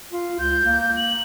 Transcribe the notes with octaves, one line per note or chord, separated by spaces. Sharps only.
F4
C#2 G6
A#3
F#7